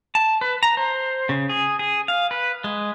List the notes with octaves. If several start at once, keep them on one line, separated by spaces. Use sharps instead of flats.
A5
B4
A#5
C5
C#3
G#4
G#4
F5
B4
G#3